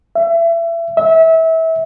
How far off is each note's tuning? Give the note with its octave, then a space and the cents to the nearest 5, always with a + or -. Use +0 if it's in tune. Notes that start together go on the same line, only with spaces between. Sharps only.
E5 +30
E5 -25